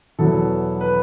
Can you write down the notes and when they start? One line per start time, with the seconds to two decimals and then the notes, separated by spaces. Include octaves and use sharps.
0.18 E2 B2 F#3 B3 E4 A4
0.81 B4